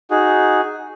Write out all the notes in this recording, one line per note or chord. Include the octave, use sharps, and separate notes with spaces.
D#4 F#4 G#4